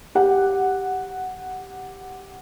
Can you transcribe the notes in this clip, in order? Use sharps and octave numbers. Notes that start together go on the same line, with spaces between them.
G4 F#5